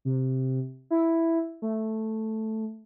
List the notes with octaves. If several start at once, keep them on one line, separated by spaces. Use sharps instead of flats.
C3
E4
A3